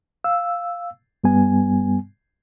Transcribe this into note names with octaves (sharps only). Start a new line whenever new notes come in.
F5 E6
G2 G3 B3 G#5